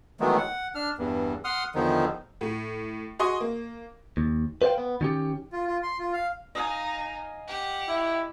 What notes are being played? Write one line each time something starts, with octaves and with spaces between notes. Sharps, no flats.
D#3 E3 F#3 G#3 A3 B3
F#5
D4 F6
E2 G2
F#5 C6 D#6 F6
E2 D3 D#3 F3 D#4
A2
F#4 G#4 D#5 C6 C#6 D#6
A#3
D#2
B4 C5 D5 F5 G5
B3
D#3 C#4 G4
F4
F4
C6
F4
F5
D#4 D#5 F5 G#5
G4 F#5
E4